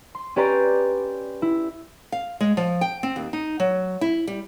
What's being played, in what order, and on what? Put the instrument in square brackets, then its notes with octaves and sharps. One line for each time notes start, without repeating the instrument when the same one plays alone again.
[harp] C6
C#4 G4 B4 D5 A#5 C6
E4
[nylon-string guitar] F5
G#3
F3
G5
C4
D#2
D#4
F#3
E4
G3